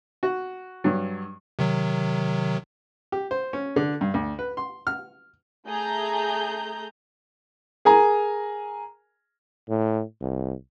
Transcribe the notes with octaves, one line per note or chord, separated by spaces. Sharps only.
F#4
G2 F#3
C3 D#3 F#3
G4
C5
C#4
D3
G2
D2
B4
C6
F6
A3 G#4 A#5 G6
G#4 A#4 G#5 A#5
A2
C2